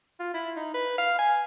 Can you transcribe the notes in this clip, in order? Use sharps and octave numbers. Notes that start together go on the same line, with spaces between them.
F4
E4
D#4
B4
F5
G#5